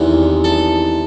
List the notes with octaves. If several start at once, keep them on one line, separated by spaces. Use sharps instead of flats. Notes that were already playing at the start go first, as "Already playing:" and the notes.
Already playing: E2 C3 D#3 G#3 B3
A4